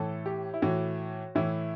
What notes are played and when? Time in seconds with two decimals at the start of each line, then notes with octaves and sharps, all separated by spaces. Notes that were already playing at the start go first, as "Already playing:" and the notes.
Already playing: A2 E3 A4
0.26 G4
0.54 E4
0.62 A2 E3 F#4
1.35 A2 E3 E4